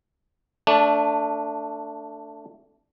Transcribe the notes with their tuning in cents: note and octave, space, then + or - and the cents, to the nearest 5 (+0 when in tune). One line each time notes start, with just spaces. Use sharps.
A3 +15 D4 -10